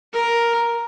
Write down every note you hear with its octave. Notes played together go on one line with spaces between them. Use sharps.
A#4